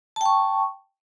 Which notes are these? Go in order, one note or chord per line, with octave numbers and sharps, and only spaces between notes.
G5 A5 C#6